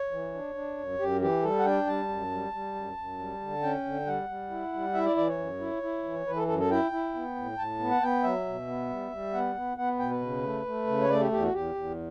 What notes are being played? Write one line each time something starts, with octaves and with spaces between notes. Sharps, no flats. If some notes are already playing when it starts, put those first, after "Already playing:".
Already playing: C#5
E3
D4
D4
F#2
F#2 G4
E3 G4
G3 A4
F#5
D4 G5
G3 A5
F#2
G3
G3
F#2
F#2
G3
D3
C#4 G5
D3
G3 F#5
G3
E4
G3
E4 E5
D5
E3 D5
C#5
F#2
E4
E4
E3
E3 B4
A4
F#2 A4
A4
E4 G5
E4
B3
A2
A2 A5
B3
F#5
B3 G5
F#3 E5
B2
B3
G3
G3
B3 F#5
B3
B3 F#5
B2 G5
B4
C#3
A3
A3
C#3
C#5
A3 D5
G4
E2 G4
F#4
E2 G4
E2